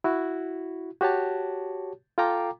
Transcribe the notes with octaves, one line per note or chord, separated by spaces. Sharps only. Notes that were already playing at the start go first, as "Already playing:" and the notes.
E4 F#4
F#4 G4 C#5 A5
F4 A4 F5 G5 A#5 D6